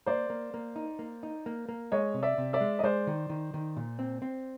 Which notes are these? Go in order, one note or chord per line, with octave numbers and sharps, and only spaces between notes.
A#3 C5 D5
A#3
A#3
D#4
A#3
D#4
A#3
A#3
G#3 C#5 D#5
C3
D5 E5
C3
D5 E5
G#3
D#5
G#3 C5 D5
D#3
D#3
D#3
A#2
C4
C4